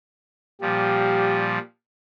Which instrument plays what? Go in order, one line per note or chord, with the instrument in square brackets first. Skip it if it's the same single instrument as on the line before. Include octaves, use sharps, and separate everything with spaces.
[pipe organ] A#2 F3 G3 [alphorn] G4